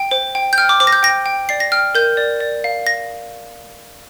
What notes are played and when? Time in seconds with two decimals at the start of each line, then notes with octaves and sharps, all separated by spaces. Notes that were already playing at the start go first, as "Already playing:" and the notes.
Already playing: G5
0.11 C5
0.35 G5
0.53 G6
0.58 G5 F6
0.69 D6
0.80 C5 D6
0.87 A#6
0.93 G6
1.03 G5 A#6
1.26 G5
1.49 D5 C7
1.60 A#6
1.72 G5 F6
1.95 A#4 G6
2.17 D5
2.40 D5
2.64 F5
2.87 A#6